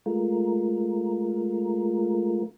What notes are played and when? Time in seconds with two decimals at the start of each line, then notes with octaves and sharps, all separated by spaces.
0.06 G#3 A3 F4 A#4